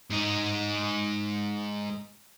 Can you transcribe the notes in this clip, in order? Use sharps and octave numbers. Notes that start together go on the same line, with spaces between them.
G#2 D#4